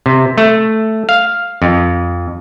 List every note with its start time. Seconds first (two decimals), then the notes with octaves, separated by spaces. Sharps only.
0.06 C3
0.38 A3
1.09 F5
1.62 F2